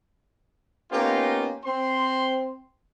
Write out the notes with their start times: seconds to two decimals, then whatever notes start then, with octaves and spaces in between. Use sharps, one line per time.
0.92 A#3 B3 C#4 D#4 F4 G4
1.65 C4 C6